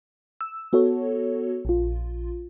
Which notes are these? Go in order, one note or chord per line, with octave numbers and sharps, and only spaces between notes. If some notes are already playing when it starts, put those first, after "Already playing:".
E6
B3 F#4 A4 C#5
A#1 F4